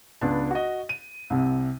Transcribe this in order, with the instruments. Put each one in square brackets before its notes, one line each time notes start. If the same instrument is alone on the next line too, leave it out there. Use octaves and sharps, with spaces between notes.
[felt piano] C#2 B3 D4 A5
F#4 D#5
D#7
C2 C3